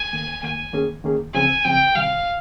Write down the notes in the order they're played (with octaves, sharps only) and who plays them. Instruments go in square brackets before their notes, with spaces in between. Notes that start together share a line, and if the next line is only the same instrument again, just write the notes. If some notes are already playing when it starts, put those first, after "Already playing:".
Already playing: [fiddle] G#5
[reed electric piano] D#2 D#3 A#3
[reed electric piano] D#2 D#3 A#3 [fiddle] G#5
[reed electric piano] D#3 A#3 C#4 G#4
D#3 A#3 C#4 G#4
[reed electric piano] C#2 C#3 F3 C4 [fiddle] G#5
[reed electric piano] C#2 C#3 F3 C4 [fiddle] G5
[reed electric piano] C3 D#3 G3 [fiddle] F5